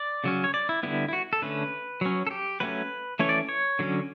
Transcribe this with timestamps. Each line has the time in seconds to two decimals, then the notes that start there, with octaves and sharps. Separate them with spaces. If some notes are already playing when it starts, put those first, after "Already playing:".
Already playing: D5
0.24 C#3 F#3 C#4
0.44 C#5
0.54 D5
0.69 E4
0.83 D3 G3 B3 E4
1.08 E4
1.13 F#4
1.33 A4
1.42 D3 A3 C#4 B4
2.01 F#3 C#4
2.27 A4
2.31 G4
2.60 F#3 A3 C#4 B4
3.19 E3 A3 C#4 C#5
3.29 D5
3.49 C#5
3.79 D3 F#3 C#4